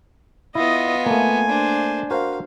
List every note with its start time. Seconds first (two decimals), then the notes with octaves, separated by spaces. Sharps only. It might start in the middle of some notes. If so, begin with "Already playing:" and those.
0.55 B3 E4 F4 D#5
1.06 A3 A#3 G#5
1.49 D4 C5
2.11 F#4 A#4 C5 F5